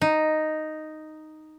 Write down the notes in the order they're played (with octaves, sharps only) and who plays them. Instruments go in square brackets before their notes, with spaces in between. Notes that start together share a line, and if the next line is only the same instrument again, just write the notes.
[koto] D#4